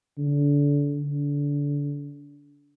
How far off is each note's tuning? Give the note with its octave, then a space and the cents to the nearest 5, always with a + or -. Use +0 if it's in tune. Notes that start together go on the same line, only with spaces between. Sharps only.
D3 -30
D3 -30